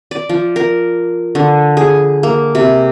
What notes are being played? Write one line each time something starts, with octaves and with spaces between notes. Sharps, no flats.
D5
F3
A#4
D3
G#4
A#3
C3